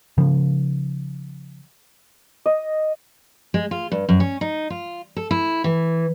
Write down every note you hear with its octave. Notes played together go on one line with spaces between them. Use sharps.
C#3 F3
D#5
G#3
F4
G2
F#2
C#4
D#4
F4
A4
E4
E3